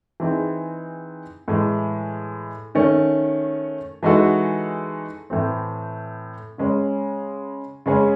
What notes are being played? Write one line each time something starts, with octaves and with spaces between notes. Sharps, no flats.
E3 C4 D#4 G#4
A2 E3 G#3
D#3 A3 C#4
E3 G#3 D#4 F#4 A4
A2 E3 C4
C#3 G#3 C#4
C#3 G#3 C#4 G#4